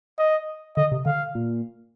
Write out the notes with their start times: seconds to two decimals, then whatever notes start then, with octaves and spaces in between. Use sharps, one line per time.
0.19 D#5
0.77 D3 D#5
0.92 C3
1.06 D3 F5
1.35 A#2